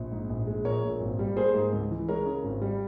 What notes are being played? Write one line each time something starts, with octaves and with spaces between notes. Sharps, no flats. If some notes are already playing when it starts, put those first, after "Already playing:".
Already playing: A#1
G#2
A#1
G#3
A#1 A#4 C#5
A#2
G#1
G3
A#3 G#4 C5
G#2
C#2
E3
G#3 A#4 C#5
C#3
G#1
G3